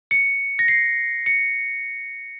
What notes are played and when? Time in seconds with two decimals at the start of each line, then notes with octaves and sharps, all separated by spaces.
0.11 C#7
0.59 A#6
0.68 C7
1.26 C#7